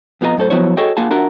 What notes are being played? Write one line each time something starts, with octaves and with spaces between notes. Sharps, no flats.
F2 B3 F4 G4 D#5 A#5
F#2 A2 A4 C5
F3 F#3 B3 E4 C5 C#5
F#4 G#4 A4 C#5 D#5 G5
A#3 F4 G#4 F5 F#5 A5
D4 F4 F#4 A#4 E5 F#5